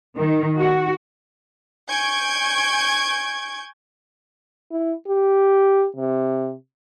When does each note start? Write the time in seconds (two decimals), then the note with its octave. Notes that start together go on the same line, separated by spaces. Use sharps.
0.18 D#3
0.57 F#4
1.89 G#5 C#6 G6 G#6 D7
4.71 E4
5.07 G4
5.97 C3